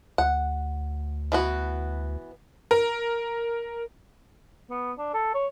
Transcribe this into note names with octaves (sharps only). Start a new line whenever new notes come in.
D2 F#5
E3 B3 F#4
A#4
B3
D4
A4
C#5